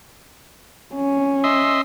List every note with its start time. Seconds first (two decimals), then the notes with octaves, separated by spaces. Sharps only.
0.94 C#4
1.44 D#5 E5 C6